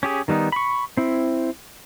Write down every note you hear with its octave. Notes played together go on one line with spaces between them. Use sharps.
C#4 G4 G#4
D#3 G3 B3 D#4
B5 C#6
C4 E4